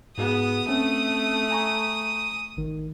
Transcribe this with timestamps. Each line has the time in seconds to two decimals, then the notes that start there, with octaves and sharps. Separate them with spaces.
0.18 G#2 B3 F#4 G#4 D#6
0.69 A3 C4 C#4
1.51 G#5 A#5 C#6
2.57 G#1 D#3